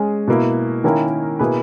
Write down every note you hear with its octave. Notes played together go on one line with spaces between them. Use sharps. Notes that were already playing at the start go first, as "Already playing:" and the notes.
Already playing: G#3 C#4 G#4
B2 A#3 E4
D#3 A#3 C#4 E4 A#4
B2 A#3 E4 G#4 B4